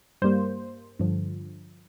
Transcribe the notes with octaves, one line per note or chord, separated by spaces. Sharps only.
G2 G3 A#3 C5
G2 D3 F3